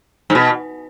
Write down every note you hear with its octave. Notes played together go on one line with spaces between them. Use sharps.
G#2
B2